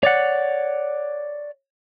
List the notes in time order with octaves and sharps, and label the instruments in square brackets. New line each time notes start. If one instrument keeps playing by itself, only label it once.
[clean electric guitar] C#5 D5 F#5